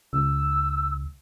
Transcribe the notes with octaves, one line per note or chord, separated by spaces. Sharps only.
C#2 E6